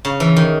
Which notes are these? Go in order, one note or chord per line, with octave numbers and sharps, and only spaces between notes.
C#3
E3
D#3